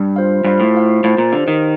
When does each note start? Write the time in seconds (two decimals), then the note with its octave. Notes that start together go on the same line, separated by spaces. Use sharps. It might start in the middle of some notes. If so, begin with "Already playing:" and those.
Already playing: G2
0.16 F4 C5 F5
0.44 G2 F4 C5 F5
0.60 A2
0.75 F4 C5 F5
1.03 A2 F4 C5 F5
1.18 A#2
1.32 D3 G4 C5 F5
1.48 D#3